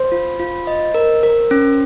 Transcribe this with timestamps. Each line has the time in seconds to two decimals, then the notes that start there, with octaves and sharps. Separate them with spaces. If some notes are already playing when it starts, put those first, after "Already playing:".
Already playing: C5
0.12 F4
0.39 F4
0.67 D#5
0.94 A#4
1.23 A#4
1.51 C#4